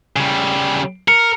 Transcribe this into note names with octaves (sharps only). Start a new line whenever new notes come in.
C#3 G3
A#4 C#7